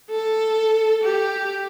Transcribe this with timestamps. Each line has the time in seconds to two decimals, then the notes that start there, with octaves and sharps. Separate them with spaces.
0.10 A4
1.03 G4